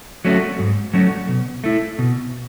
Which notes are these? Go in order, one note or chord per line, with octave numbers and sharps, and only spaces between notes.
F#3 A3 C#4 F#4
G#2
F#3 A3 C#4 F#4
B2
A3 E4
B2